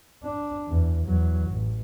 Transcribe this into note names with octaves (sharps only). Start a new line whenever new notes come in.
D4
E2
E2 F#3
A1